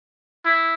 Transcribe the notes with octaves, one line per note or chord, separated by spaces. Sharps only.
E4